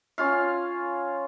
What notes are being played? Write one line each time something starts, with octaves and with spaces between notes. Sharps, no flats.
C#4 F4 F5